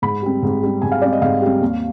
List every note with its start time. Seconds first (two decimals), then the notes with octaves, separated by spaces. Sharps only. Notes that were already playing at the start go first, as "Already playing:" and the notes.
0.02 G#2 B5
0.22 G3 C4
0.42 G#2
0.63 G3 C4
0.82 G#2 G#5
0.92 F5
1.01 G3 C4 D5
1.12 D#5
1.22 G#2 F5
1.42 G3 C4
1.61 D#2